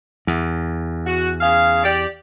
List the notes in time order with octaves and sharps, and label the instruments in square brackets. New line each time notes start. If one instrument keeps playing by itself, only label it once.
[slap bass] E2
[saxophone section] F#4
C#3 G#4 F5
G4 D5